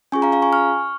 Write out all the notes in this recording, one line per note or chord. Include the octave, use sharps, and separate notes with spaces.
C#4 F4 G#4 G#5 C#6
F5 A#5
F5 A#5
G#5 C#6
C#6 F6